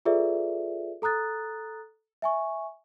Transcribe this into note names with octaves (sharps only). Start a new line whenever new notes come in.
F4 G#4 A4 B4 D5 E5
A4 A#5 D#6 F#6 A6
E5 G#5 C#6